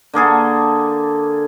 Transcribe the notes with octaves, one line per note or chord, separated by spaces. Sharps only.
D3 A#3 G#4 A4